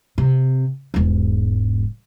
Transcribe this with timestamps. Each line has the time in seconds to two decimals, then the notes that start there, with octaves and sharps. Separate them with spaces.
0.18 C3
0.94 E1 G#2